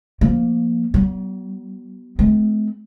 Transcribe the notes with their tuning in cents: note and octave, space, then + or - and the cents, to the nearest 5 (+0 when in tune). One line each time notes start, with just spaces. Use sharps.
F3 +0 A#3 +10
F#3 +45 B3 -15
G#3 +45 C4 -45